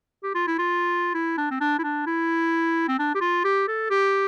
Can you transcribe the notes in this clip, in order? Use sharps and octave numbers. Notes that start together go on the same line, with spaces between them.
G4
F4
E4
F4
E4
D4
C4
D4
E4
D4
E4
C4
D4
G4
F4
G4
A4
G4